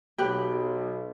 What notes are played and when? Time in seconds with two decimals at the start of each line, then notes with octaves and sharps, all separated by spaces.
0.18 B1 G4 B4